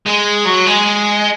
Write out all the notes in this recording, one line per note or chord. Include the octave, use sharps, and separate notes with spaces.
G#3
F#3
G#3